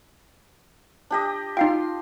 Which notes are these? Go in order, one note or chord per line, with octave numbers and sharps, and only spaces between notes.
D4 G4 D#5
D#4 F4 F5 G5 C6